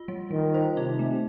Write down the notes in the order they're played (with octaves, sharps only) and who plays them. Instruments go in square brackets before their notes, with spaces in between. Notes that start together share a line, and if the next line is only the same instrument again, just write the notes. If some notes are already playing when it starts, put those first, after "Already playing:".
Already playing: [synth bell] F4
G3
[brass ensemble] D#3 [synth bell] G3
[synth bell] C5
[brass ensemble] C3 [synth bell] D#4
[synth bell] A3